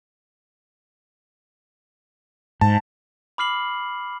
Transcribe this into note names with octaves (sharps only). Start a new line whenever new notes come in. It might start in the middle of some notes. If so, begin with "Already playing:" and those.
G#2 A5
B5 D6 F6 C7 F#7